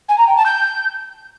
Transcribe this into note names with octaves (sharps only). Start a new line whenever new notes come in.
G#5
A#5
G5
A5
G6